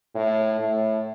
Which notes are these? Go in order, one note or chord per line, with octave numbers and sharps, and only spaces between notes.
A2
A2